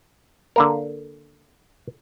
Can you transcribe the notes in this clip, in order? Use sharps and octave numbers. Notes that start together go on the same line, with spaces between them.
D3 A#3 A#4